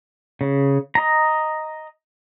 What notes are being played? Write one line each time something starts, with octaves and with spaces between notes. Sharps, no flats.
C#3
D#5 A#5